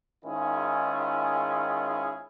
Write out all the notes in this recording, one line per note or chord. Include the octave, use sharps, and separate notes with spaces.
G#2 D#3 C#4 E4 F4 G#4